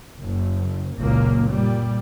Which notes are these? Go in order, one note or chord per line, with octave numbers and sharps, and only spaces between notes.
F#1
F#1 C#2 A#2 A#3
A#2 G3